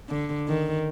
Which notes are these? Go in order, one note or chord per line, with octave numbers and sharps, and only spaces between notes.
D3
D#3